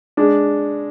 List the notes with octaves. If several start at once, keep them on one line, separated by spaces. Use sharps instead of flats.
G#3 D4